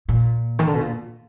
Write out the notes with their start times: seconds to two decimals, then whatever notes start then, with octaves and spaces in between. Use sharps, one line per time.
0.09 A#2
0.59 D#3
0.67 D3
0.74 B2
0.81 A#2